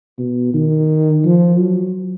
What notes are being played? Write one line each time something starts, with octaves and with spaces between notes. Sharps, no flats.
B2
D#3
F3
F#3